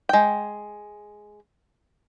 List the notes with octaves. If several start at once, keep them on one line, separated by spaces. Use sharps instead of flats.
G#3 G5